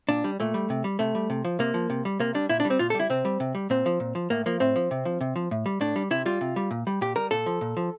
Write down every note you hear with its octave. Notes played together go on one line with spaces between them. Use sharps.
A#2 D4
G3
A#2 A3
G3
C3
G3
C3 A3
G3
C3
F3
C3 A#3
F3
C3
G3
C3 A#3
G3 D4
A#2 E4
D4
G3
C4
A#2 F4
A4
G3
E4
C3 C4
G3
C3
G3
A#2 C4
F3
A#2
F3
A2 A#3
F3 A#3
A2 C4
F3
C3
F3
C3
F3
A2
G3
A2 D4
G3
C3 E4
G3 F4
C3
G3
A#2
G3
A#2 G4
G3 A#4
A#2 A4
F3
A#2
F3